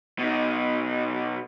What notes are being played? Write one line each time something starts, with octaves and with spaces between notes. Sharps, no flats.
B2 D#4